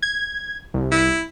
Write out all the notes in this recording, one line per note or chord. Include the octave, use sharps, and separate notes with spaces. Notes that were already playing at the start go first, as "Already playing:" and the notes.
G#6
C2
E4